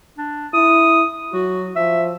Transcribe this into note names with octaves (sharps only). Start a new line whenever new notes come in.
D4
E4 D#6
F#3 F#4
F3 E5